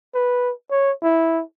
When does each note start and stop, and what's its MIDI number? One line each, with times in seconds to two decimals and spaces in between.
0.14 0.52 71
0.71 0.92 73
1.03 1.42 64